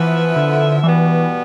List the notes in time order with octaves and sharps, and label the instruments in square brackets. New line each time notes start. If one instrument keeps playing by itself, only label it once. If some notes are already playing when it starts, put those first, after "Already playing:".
Already playing: [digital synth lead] E3 [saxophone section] F3 B3 E4 B4 E5
[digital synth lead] D3
[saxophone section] B2 G3 B3 [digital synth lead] E3